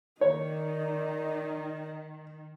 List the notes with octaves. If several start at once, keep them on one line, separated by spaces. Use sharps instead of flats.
D#3 D#4 A#4 C#5 D5